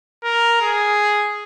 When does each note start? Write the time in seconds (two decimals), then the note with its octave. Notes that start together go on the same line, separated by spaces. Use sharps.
0.24 A#4
0.61 G#4